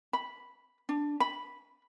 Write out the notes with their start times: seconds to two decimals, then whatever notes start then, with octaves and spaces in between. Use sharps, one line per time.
0.13 B5
0.89 D4
1.20 B5